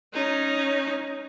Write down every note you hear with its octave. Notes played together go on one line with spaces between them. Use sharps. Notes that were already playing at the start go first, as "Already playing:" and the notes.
C#4 D#4